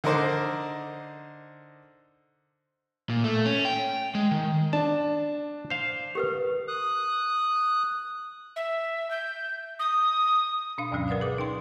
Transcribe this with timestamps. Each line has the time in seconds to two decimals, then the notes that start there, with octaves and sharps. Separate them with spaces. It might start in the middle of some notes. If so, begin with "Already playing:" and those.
0.04 D3 D#4 A#4 C5 D6
3.10 A#2
3.24 A3
3.46 C#4
3.65 G5
4.15 G#3
4.31 D#3
4.73 D4 A5
5.70 C5 F5
6.15 G4 A#4 B4
6.68 D#6 F#6
8.56 E5
9.10 G6
9.79 D#6
10.78 B2 D4 F5
10.91 D2 G2 B2 E3 F#3 C#4
11.08 A#4 B4 D5 F#5 D#6
11.21 G#4 D6
11.38 D#4 G5 C6